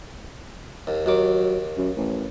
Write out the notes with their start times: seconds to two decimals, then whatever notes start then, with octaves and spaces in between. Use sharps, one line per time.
0.87 D#2
1.06 D#2 D#3 F#3 D6
1.77 F#2
1.97 A1